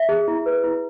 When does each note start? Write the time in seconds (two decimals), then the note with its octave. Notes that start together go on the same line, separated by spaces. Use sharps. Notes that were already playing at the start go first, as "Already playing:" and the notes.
Already playing: E5
0.09 G#4
0.28 E4
0.46 B4
0.64 E4